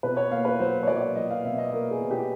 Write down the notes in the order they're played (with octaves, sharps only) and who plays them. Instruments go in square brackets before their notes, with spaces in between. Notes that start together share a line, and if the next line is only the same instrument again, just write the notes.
[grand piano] B2 B4
C#5
A#3 F5
B4
F#3 C5
C#5
F#3 D5
F#3 D#5
F5
B2 E5
D#5
A#3 A#4
G#4
B2
G4